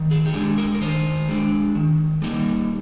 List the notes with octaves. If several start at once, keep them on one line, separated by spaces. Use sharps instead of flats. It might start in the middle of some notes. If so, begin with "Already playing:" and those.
Already playing: D#3
G#4
G4
G#3 D4 G#4
A#4
A#4
D#3 C5
G#3 D4
D#3
G3 A#3 D#4